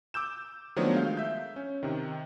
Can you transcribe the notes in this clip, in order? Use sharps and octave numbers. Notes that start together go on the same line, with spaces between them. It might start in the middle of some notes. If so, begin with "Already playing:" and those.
D6 E6 G6 E7
D#3 F3 F#3 A3 B3 D4
G#3 F5 G6
E5 G6
C#4
C3 D#3